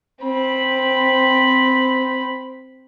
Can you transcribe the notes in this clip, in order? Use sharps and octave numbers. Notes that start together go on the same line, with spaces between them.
C4 B5